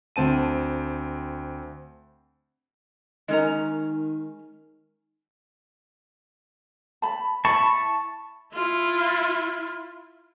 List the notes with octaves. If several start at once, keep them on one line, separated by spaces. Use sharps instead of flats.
D2 C4 A5 D#7
D#3 G#3 C#4 A#4 D#5 A#5
A5 B5
E4 A5 B5 C#6
E4 F4